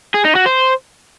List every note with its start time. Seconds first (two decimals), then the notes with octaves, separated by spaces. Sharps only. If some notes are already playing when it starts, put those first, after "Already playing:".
0.14 G#4
0.25 D#4
0.35 F#4
0.46 C5